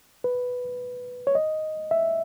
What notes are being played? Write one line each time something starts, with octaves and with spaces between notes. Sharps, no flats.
B4
C#5
D#5
E5